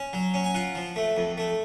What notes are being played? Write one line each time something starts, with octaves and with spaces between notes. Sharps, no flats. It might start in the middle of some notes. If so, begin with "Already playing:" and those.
Already playing: C#4
F#3
C#4
G#5
F4 F#5
F3
A3
F2
A3